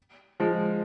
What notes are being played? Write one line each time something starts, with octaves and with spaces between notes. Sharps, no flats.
F3 G#3